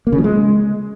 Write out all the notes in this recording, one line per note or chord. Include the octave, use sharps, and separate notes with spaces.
A#3
C#3
F3
G#3